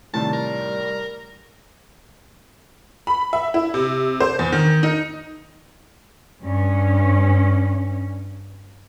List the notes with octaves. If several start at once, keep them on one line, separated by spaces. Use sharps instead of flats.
A2 C3 D#3 G3 A5
A#4
B5
E5
E4
C3
C5
E2
D#3
D#4
G2 C#4